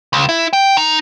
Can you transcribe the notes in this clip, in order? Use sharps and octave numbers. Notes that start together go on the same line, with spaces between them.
C#2
E4
G5
D#4